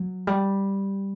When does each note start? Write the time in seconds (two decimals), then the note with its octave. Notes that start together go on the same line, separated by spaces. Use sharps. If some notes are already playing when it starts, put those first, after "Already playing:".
Already playing: F#3
0.27 G3